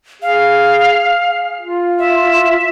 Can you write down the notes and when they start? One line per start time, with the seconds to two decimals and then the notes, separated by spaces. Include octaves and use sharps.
0.22 G#4 F5
1.61 F4
1.99 E5